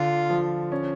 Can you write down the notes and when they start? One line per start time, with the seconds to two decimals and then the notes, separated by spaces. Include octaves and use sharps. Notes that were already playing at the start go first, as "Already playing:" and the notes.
Already playing: D3 F4
0.30 F3
0.72 C#4